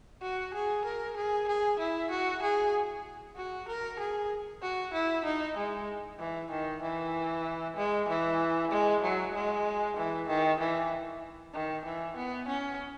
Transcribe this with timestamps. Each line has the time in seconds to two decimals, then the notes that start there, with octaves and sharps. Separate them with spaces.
0.22 F#4
0.54 G#4
0.85 A#4
1.17 G#4
1.48 G#4
1.79 E4
2.11 F#4
2.43 G#4
3.37 F#4
3.68 A#4
3.99 G#4
4.62 F#4
4.94 E4
5.25 D#4
5.57 G#3
6.19 E3
6.51 D#3
6.82 E3
7.76 G#3
8.08 E3
8.71 G#3
9.02 F#3
9.34 G#3
9.97 E3
10.28 D#3
10.60 E3
11.54 D#3
11.85 E3
12.16 B3
12.48 C#4